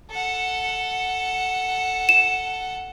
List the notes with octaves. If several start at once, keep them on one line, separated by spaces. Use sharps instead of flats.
A4 F#5
E7